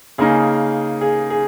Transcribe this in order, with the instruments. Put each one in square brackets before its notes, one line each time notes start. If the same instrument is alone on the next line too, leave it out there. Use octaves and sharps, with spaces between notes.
[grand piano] C#3 A#3 D#4 [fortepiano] G#4
[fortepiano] G#4
G#4